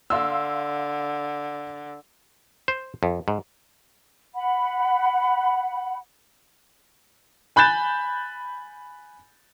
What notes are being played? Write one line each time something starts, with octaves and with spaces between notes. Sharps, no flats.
D3 F5 C6 E6
C5
F2
G#2
F#5 B5
G#5 B5 F#6 G6 A6 E7